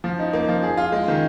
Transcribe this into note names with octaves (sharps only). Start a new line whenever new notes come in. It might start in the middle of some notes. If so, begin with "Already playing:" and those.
F3
D#4
A#3
F3
G#4
F4
G#3
D#3